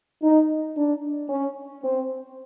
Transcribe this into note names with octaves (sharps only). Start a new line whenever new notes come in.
D#4
D4
C#4
C4